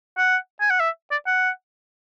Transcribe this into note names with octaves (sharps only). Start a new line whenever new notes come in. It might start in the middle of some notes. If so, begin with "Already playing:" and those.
F#5
G#5
F#5
E5
D5
F#5